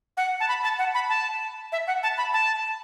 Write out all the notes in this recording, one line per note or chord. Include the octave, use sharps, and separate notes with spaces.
F#5
A5
B5
A5
F#5
B5
A5
E5
F#5
A5
B5
A5